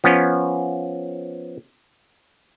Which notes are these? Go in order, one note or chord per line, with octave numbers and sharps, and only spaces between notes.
F3 B3 C#4